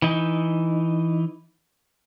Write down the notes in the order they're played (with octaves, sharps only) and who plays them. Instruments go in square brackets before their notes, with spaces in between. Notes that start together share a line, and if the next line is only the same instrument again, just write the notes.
[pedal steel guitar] E3 D#4